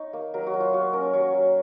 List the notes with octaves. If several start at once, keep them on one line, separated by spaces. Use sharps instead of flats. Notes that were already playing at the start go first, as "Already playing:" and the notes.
Already playing: D#4 C#5
A#3
F#3 A#4
F#4
F#3
F4
A#3 F#4
C#4 A#4
F#3 C#5
F#3